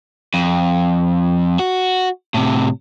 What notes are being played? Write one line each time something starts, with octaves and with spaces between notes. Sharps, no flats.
F2
F#4
A2 C3